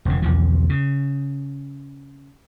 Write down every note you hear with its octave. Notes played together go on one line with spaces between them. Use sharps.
E1 C#3
B1 E2 F3
C#3